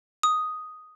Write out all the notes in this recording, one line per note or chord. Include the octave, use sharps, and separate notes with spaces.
D#6